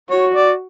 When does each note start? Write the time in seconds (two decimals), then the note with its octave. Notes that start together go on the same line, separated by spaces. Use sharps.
0.10 F#4 C#5
0.34 D5